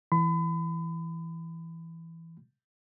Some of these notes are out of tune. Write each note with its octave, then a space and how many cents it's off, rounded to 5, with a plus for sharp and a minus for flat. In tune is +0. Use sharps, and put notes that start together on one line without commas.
E3 +0 B5 +35